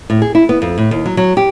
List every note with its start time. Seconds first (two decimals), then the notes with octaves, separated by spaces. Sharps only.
0.10 A2
0.22 G#4
0.35 E4
0.49 B3
0.62 F2
0.78 A2
0.91 D#2
1.06 F#3
1.17 F#3
1.37 G4